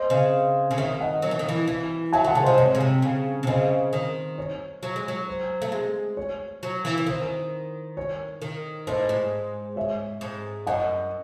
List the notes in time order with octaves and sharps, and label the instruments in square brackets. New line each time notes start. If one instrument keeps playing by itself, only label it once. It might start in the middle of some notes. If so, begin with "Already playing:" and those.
Already playing: [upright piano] C5 D#5
[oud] C#3
C#3
[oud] D#3 [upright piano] C#5 E5
[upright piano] D#5 F#5
[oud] F#3
E3
D#3
E3
E3
[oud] F#3 [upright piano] E5 G#5
[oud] D#3 [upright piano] F#5 A5
[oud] C#3
[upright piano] C5 D#5
[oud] C3
[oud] G#2 [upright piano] C#5
[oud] C#3
C3
C#3
C3
[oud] C#3 [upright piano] C5 D#5
[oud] D#3
[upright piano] C#5
[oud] F#3
G#3
F#3
[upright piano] C5
[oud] A3
G#3
[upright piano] C#5
[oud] F#3
E3
E3
[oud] D#3 [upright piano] C5
[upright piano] C#5
[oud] D#3
[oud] A2 [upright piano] C5 D#5
[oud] G#2
[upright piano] C#5 E5
[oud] G#2
[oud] F#2 [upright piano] D#5 F#5